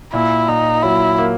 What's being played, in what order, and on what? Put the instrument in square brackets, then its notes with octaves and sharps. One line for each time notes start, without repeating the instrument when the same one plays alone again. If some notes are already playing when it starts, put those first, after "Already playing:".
[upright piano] A#2 [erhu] E4
[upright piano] A#2 [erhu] D#4
[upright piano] F#3 [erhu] E4
[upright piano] A#3